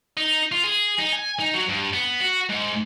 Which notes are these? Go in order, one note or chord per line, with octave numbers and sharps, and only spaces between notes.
D#4
F4
G#4
D#4
G#5
D#4
F#3
G2
B3
F#4
G#2